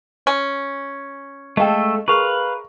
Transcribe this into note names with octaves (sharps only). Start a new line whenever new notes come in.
C#4
G#3 A3 A4 D#5 F5 G5
G#4 A#4 B4 F5 C6 C#6